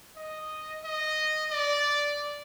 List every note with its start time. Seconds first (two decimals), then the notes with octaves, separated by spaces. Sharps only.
0.16 D#5
0.84 D#5
1.51 D5